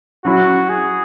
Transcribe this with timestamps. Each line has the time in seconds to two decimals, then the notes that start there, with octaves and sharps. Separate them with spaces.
0.25 F#3 C#4 E4 F#4
0.69 G#4